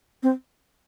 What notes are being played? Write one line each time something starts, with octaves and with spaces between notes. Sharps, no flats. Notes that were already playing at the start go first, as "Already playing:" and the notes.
C4